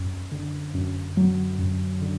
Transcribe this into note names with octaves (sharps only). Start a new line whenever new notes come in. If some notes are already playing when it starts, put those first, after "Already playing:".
Already playing: F#2
D3
F#2
F#3
F#2
D3